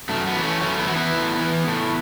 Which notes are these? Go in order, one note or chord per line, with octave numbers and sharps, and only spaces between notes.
F#2 A3
F#3 B3
E3
A3 C#4
F#2 A3 C#4
B3 E4
E3 F#4
B3 E4
A2
E3
A2